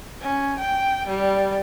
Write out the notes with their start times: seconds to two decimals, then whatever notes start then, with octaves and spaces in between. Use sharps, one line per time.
0.21 C#4
0.59 G5
1.07 G3